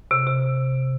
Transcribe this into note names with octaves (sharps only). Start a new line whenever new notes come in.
C3
C3